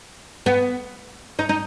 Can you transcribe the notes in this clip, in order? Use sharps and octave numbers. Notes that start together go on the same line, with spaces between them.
B3
D#4
D#4